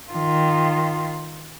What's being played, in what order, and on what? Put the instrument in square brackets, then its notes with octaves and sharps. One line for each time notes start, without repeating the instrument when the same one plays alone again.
[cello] D#3 F4